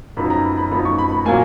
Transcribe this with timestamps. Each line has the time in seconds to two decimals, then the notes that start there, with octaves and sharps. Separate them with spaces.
0.17 F#2 F3 B3 D#4 B5
0.30 A#5
0.44 B5
0.58 B5
0.72 F#2 F3 B3 D#4 B5
0.85 C#6
0.98 B5
1.12 B5
1.25 A#2 F#3 A#3 G#5